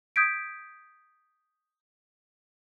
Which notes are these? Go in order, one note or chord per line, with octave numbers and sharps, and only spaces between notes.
D#6 G6 G#6 B6 D7